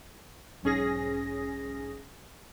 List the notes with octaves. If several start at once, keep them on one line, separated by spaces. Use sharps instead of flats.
B1 G#2 C#4 G#4 A#6